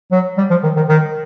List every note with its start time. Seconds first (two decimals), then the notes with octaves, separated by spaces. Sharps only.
0.12 F#3
0.37 G3
0.50 F3
0.63 D#3
0.76 D#3
0.89 D#3